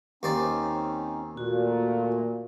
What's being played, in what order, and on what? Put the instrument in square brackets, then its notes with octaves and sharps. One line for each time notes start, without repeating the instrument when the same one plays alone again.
[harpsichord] D#2 C5 D5 [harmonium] C4 C#4 D#4
[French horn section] A#2 [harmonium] A3 [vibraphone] F#4